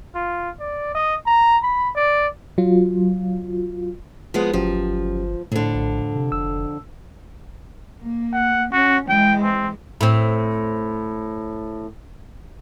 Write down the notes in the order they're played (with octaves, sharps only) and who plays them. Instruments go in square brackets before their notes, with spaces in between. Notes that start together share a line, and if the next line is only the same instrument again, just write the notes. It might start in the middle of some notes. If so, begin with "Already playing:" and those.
[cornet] F4
D5
D#5
A#5
B5
D5
[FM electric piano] F#3 F4
[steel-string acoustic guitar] F3 G#3 B3
[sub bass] G1 [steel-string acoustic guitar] F3 [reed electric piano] F#3 C#4 G4
[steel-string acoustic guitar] F2 D3 [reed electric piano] A2
[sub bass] A#1
C3
[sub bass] F1 [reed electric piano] E6
[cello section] A#3
[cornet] F#5
[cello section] C#4 [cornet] F#4
[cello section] E3 G#3 [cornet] G5
[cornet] C4
[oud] A2 C4